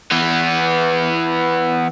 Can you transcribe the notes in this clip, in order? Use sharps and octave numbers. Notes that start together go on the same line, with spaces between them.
E3 B3